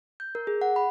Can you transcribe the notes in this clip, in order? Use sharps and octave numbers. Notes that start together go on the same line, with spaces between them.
G6
A#4
G#4
F#5
B5